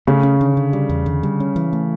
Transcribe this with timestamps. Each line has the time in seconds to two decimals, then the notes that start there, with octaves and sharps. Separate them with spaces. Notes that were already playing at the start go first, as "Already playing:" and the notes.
0.07 C#3 A3
0.23 C#4
0.41 D3
0.57 D3
0.73 G3
0.90 E2
1.06 D3
1.23 G3
1.40 C#4
1.56 E3
1.73 A3